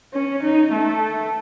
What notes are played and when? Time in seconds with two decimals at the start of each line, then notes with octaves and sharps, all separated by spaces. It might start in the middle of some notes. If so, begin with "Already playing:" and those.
0.14 C#4
0.43 D#4
0.72 A3